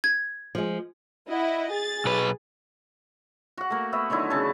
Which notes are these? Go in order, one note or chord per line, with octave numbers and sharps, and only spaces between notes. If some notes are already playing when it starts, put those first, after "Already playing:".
G#6
F3 G#3
E4 D#5 F#5
G#4 A6
B1 B4
F#4 F#5
A3 A#3
B3 E5 F#5
D3 D#3 F#3 E4
C#3 A4 A5